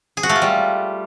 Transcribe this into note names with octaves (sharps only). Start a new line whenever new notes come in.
G#4
F#4
A3
F4
G3